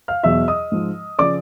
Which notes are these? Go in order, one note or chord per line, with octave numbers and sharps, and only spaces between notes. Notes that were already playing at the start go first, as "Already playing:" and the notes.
F5 F6
E2 B2 F#3 E5 E6
D#5 D#6
G#2 F3
C#3 F3 D5 D6